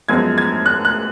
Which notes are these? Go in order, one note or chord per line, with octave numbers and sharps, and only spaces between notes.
F#2 F3 G#3 B3 G#6
G#6
F#6
F#6